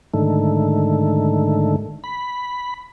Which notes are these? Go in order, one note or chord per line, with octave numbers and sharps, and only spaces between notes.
G#2 D3 D#3 A3
B5